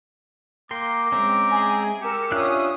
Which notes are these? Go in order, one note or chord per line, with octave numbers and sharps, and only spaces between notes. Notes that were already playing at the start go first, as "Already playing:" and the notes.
A#3 A#4 G5 C6 D6
G#3 C4 C#4 E5 G5 A#5
G#4
G4 A#4 E6 C#7
C#4 D4 F4 E5 D#6 F#6